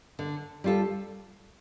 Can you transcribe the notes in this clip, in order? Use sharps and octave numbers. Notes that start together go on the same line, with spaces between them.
D3
G3 F4 A4